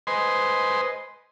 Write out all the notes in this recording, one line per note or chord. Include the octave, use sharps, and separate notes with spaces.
B4 C5 D#5 G#5 C6